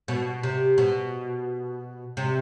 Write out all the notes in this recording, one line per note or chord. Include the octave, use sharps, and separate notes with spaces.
B2
C3
B2
C3